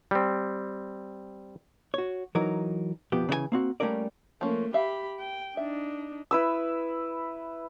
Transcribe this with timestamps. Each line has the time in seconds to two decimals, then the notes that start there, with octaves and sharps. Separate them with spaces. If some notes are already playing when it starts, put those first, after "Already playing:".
0.11 G3 C4
1.94 F#4 C#5
2.35 E3 F#3 D#4 A#4
3.12 F2 B2 F3 B3 G4
3.29 C#3 E3 F#4 G#5
3.52 A#3 C4 F#4
3.80 G3 A3 A#3 C#4 A#4 D5
4.41 F3 A3 A#3 C#4
4.74 G4 E5 F5 B5
5.19 G5
5.57 D4 D#4 E5
6.31 E4 B4 E6